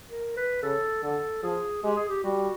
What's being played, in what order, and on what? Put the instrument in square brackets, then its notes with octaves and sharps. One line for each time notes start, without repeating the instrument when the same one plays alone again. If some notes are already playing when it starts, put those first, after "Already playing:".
[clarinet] A#4
B4
[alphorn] C#3 [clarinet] A4
[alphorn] D3 [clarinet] A4
[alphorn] F3 [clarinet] G#4
[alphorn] G#3 [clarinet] G4
[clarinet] G#4
G4
[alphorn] G3 [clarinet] F#4